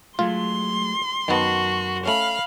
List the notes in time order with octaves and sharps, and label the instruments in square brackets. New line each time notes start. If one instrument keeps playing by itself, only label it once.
[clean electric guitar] F#3 G#3 A3 [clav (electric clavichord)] F4 [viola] C6
[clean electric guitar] F#2 A#4 A5 [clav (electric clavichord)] D#3 B3 [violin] F#4
[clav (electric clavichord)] A3 C#4 [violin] F5 B5